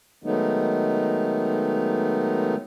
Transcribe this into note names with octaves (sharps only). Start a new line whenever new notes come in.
D#3 F#3 G#3 A3 B3 D#4